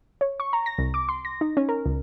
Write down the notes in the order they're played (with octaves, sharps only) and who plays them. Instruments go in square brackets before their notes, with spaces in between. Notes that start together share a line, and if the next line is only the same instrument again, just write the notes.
[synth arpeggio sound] C#5
C#6
A#5
A#6
C2
D6
C6
A#6
D#4
C#4
A#4
C#2